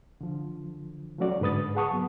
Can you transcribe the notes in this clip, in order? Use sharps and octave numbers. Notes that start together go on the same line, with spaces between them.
D3 F3
F3 F#3 A3 C#4 F#4 D5
G#2 D3 B4 D#6 A6
G#4 B4 F#5 A5 C#6 D#6
F#3 B3